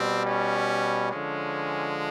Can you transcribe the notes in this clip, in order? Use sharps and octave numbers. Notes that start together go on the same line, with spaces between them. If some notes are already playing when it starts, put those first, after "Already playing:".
Already playing: B2 G3 C4
C#4
D3 F3 G#3 C#4